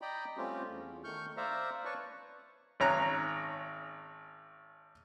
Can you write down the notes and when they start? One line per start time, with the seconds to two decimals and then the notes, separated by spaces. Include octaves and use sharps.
0.02 D5 D#5 G5 A#5 B5
0.37 G3 A3 C4 C#4 F4 G4
0.69 E2
1.04 D#3 A3 C#6 F6 G6
1.37 C5 D5 E5 F5 A#5
1.85 B4 C#5 D5 A5 C#6
2.80 G#1 C#4 A#5 F#6